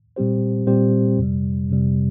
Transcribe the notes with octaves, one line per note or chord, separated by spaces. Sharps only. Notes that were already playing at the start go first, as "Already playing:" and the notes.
A#2 G3 C4 G4 C5
A#2 G3 C4 G4 C5
F2 C3 G3
F2 C3 G3